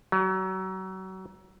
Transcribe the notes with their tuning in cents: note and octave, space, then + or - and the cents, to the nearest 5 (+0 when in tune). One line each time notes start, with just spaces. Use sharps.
F#3 +30